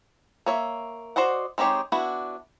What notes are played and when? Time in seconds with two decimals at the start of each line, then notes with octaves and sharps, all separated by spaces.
0.46 A#3 C#5 E5
1.16 F#4 C5 D5 D#5 F#5
1.58 G#3 C4 D#4 G4 C#5
1.92 B3 D4 E4 F#4